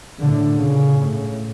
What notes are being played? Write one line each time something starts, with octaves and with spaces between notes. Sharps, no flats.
A2 D3
A#2 C#3
A2